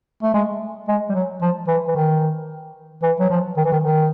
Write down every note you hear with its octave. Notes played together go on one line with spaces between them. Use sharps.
A3
G#3
G#3
G3
F#3
F3
E3
E3
D#3
E3
F#3
F3
D#3
E3
D#3
D#3